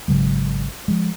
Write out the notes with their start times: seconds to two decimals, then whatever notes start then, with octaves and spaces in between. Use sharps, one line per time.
0.08 G#1 C#3 F#3 G#3
0.88 F3 G#3